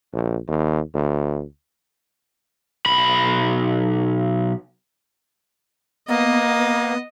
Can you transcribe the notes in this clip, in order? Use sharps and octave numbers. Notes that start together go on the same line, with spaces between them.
A#1
D#2
D2
B1 B5
A#3 B3 D#5